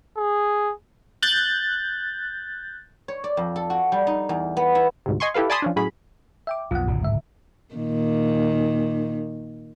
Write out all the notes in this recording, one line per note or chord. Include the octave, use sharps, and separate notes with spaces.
G#4
F#6 G6 A6
C#5
D5
F2
A4
F#4
G3
D#4
E2
B3
E4
D2 G#2 C3
D#5 G#5 C6 C#6
E4 G4 A4 B4 F5
D5 G#5 A5 B5 C6 D#6
F3 C#4 D4
A2 F#3 C#4 G#4 B5
E5 G5 D6
B1 F2 B2 F4 F#5
D1 A#1 F#2 C#3
G#2 E5
A#2 D#3